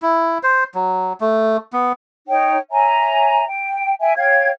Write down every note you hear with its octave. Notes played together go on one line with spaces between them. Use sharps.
E4
C5
F#3
A3
B3
D#4 C#5 G5
C#5 E5 G#5 A#5
G5
E5 G5 G#5
C#5 F5 G5 G#6